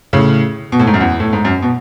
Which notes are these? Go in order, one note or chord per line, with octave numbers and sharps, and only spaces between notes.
A2 C#3
B2
A2
G#2
F#2
E2
A2
G#2
F#2
B2